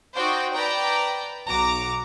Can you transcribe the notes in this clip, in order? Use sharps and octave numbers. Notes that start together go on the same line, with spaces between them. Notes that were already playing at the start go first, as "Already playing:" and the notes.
D#4 F#4 C5 D5 F#5 G5
B4 D5 G5 A5 A#5
B1 F#4 A#5 D6